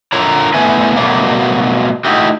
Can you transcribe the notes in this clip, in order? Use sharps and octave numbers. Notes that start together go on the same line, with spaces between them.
D3 F4 A#4 C#5 A#5
A2 A3 B3 B4 E5 G#5
B2 F#3 G3 A3 A#3
A3 D#4 E4 F#4 G4